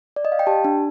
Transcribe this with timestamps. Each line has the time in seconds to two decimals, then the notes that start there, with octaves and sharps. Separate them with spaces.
0.16 D5
0.25 D#5
0.32 F5
0.39 G5
0.47 G4 A5
0.64 D4